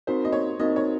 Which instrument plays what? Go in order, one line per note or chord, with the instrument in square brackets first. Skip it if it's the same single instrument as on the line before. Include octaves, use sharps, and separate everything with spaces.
[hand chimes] C4 D#4 F#4 A#4 [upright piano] C5
[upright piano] D#5
C#5
[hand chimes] C4 D#4 F#4 A#4 [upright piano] D#5
[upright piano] C#5